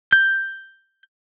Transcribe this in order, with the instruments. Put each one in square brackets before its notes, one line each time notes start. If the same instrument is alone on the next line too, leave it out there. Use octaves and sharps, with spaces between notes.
[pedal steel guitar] G6